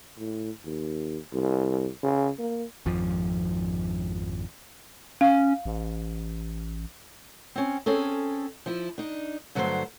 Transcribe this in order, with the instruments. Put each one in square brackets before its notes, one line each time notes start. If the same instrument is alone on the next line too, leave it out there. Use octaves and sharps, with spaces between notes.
[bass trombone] A2
D#2
C2
C#3
A#3
[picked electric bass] G#1 F2 F3
[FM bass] C#4 [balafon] F5
[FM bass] A1
[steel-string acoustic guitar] C4 C#4
C4 C#4 G#4 A4
F3 E4
D4 D#4
G2 D3 F#3 A3 B4 C5